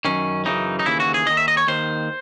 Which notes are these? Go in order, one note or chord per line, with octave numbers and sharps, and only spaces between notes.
F#2 D#3 C#4
F#2 C#3 E3 D#4
D#4
D#2 C#3 E3 E4
F#4
G#4
D#2 D#3 D#5
E5
D#5
C#5
D#2 D#3 C5